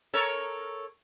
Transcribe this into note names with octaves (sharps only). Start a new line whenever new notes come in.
A4 A#4 C#5